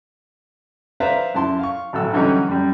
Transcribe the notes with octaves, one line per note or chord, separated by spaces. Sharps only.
B4 C5 D5 E5 F5 A#5
F#2 E4 A5 C6
F5 C#6
G#1 A2 F#3 E6
D3 E3 F#3 G3 C#4 D#4
F#2 G3